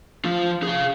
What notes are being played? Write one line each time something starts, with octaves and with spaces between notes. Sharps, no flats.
F3 F4
G#4 F5